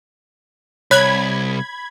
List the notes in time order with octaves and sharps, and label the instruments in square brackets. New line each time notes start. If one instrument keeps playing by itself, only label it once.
[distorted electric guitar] C2 [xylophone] C#5 F#6 F7 [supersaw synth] B5 G#6